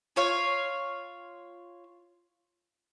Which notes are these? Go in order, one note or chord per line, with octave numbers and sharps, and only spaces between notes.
F4 C#5 F5